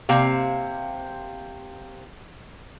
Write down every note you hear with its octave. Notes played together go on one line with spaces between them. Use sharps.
C3 A#3 C4 F5